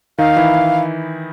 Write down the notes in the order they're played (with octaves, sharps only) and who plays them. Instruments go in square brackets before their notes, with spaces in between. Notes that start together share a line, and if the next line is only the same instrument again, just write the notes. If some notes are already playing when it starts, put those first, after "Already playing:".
[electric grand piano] D#3 D#4 [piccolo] F5
[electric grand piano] E3 E4